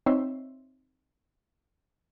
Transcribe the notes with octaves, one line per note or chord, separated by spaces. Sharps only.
C4 D#4 C#5 E5 C6